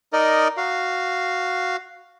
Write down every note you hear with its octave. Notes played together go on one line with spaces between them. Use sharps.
D#4 A#4 D5 D#5
F#4 F5